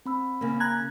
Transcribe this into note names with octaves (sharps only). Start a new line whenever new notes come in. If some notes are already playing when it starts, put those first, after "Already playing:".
C4 B5 E6
C#3 A#3
A#5 F#6 G#6